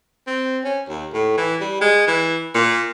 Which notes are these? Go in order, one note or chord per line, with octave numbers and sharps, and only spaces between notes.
C4
C#4
D#2
A2
E3
G3
G#3
E3
A#2